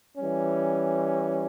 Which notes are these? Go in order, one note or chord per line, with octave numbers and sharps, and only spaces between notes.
E3 G3 C#4